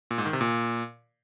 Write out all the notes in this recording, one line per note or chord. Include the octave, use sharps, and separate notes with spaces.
A#2
G#2
D#3
C3
A#2